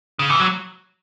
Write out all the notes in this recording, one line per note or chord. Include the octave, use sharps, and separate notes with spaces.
C#3
E3
F#3